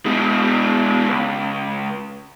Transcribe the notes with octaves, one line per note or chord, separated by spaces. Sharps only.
B2 G#3
C#2